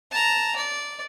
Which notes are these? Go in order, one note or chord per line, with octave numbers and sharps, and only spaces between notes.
A5 A#5
D5